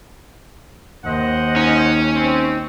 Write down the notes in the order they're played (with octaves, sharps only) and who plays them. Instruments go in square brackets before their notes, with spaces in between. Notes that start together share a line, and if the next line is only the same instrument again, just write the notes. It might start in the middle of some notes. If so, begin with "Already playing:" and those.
[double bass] D#2 [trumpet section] C5 D#5 F#5
[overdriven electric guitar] C#4 [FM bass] D#4
[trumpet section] C4